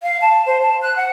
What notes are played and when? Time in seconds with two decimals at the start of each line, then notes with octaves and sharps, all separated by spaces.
0.03 F5
0.21 A5
0.46 C5
0.62 A5
0.82 F#6
0.96 F#5